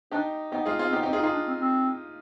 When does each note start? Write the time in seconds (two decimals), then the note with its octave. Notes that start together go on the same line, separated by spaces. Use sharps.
0.11 D4 D#4 G4
0.52 B3 D#4 G4
0.65 G#3 F4 G#4
0.79 B3 F4 G#4
0.88 C4
0.93 B3 D#4 G4
1.03 D#4 G4
1.07 C4
1.13 F4 G#4
1.19 D#4
1.23 F4 G#4
1.33 D4
1.47 C4
1.61 C4